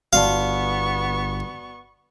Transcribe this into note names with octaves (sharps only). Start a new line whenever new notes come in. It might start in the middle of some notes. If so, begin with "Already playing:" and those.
G1 B3 F#4 D5 F5 A5 C#6